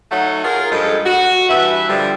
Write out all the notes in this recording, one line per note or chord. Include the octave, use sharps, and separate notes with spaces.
F#3 A3 D#4 C#5 F#5
F4 G#4 A#4
G2 F3 G#3 A4
F#4
G2 E3 B4 E5
D3 F3 G3